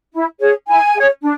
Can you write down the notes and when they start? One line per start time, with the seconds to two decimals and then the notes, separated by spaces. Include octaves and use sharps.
0.13 E4
0.40 G#4 C#5
0.68 E4 G#5
0.95 G#4 C#5
1.22 D4